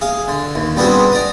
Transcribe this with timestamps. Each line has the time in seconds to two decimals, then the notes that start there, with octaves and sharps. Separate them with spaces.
0.01 G#4 F5
0.28 D3
0.55 D#2
0.77 G3 B3 C4 D4 F#4 G#4
1.12 D5 A#5 D#6